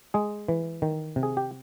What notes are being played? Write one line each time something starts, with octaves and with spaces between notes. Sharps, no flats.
G#3 G#4
E3
D#3
C3
G#4
G4